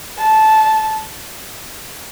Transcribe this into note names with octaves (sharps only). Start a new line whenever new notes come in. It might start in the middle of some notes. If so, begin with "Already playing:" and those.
A5